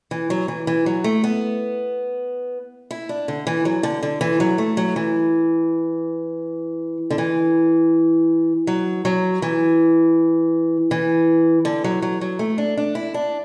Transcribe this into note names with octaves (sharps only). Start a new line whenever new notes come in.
E3
F#3
E3
E3
F#3
A3
B3
E4
D4
D3
E3
F#3
D3
D3
E3
F#3
A3
F#3
E3
D3
E3
F#3
F#3
E3
E3
D3
F#3
F#3
F#3
A3
D4
D4
E4
D4